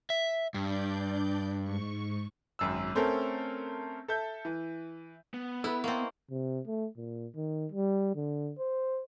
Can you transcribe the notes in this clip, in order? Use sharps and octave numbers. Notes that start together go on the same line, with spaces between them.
E5
G2 D4 D5 G6
G#2 C#6
G#1 F#2 E6
A3 C4 C#4 A4 A#4
A4 E5 G6
E3
B3
E4 A4 B4 B5
A#3 C4 D#5 C#6
C3
A3
A#2
D#3
G3
D3
C5